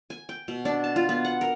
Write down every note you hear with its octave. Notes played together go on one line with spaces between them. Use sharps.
G#5
G5
B2
D4
A5
F4
B3
F#5
A#4